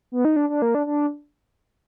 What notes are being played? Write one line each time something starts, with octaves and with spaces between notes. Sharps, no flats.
B3
D#4
D4
D4
A#3
D4
D4